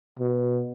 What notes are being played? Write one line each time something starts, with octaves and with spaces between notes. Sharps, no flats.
B2